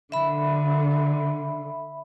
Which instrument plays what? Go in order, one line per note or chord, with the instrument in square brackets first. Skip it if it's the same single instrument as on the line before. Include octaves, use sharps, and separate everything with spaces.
[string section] D3 [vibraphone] E5 B5